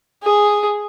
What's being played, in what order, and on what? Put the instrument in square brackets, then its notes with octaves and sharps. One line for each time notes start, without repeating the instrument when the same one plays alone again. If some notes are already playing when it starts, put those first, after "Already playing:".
[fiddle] G#4